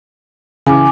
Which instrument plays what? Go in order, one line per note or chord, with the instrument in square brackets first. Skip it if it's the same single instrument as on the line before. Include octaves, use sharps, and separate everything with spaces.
[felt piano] C#3 E3 [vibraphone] G#5 D6